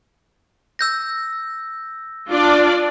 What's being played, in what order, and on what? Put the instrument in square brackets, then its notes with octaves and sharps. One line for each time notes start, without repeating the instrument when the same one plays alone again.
[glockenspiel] E6 G6 A#6
[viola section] D4 F4 D5